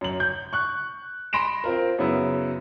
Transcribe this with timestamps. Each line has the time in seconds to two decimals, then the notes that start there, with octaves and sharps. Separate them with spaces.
0.01 F#2 F#7
0.20 G6
0.53 C#6 F#6
1.33 B5 C6 A#6 D7 E7
1.64 C4 F4 A#4
1.99 F#2 C#3 B3 E4